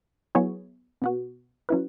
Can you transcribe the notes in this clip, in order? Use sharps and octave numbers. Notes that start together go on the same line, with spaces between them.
F#3 B3 E4 G#4 C#5
B2 B3 F#4
F#3 C#4 E4 B4